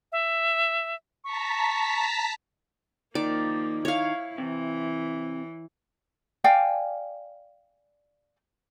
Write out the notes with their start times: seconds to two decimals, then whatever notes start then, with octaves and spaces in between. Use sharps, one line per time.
0.12 E5
1.24 A5 A#5 C#6 B6
3.15 D#3 F3 A#3 D5
3.85 E4 C#5 F5
4.38 C3 E3
6.44 D5 F5 G5 G#5